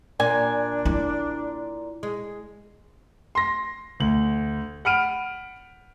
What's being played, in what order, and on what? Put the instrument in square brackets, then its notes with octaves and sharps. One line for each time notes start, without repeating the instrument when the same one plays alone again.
[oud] A#2 [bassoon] D4 [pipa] G#5
[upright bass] E4
[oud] G#3
[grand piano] C6 A#6
D2 F#7
F#5 B5 F6 D7 D#7